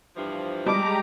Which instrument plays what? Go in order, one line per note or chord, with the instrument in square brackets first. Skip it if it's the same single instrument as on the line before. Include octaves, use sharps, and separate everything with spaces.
[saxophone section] G2 E3 F3
[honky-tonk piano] G3 D#5 A5 [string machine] G#3 G4 A#5 [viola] D6